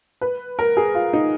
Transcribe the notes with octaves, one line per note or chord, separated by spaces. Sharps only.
B4
A#4
G#4
F4
D#4